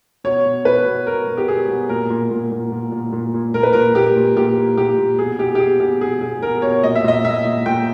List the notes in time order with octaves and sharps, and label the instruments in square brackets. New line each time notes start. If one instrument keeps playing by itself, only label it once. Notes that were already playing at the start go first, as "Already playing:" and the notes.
[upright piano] B2 C#5
B2
B2 B4
B2
B2 A#4
B2
G4
B2 G#4
B2
A#2 A#4
A#2
A#2
A#2
A#2
A#2
A#2
A#2
A#2 A#4
B4
A#2 A#4
A#2 G4
A#2
A#2 G4
A#2
A#2 G4
A#2
B2 G#4
B2 G4
G4
B2 G#4
B2 G4
B2 G#4
B2 G#4
B2 A#4
B2 C#5
A#2 D#5
E5
A#2 D#5
A#2 E5
A#2
A#2 G5